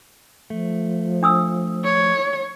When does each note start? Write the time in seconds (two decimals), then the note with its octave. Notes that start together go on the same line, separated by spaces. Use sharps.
0.50 F3 A3
1.23 D4 D#6 E6
1.85 C#5